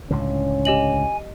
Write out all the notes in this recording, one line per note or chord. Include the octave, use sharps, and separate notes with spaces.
C#2 A2 D3 C#4
G4 D#5 G#5 F#7